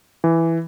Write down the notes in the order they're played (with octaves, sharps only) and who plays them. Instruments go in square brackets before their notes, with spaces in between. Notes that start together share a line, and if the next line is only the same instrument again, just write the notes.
[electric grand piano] E3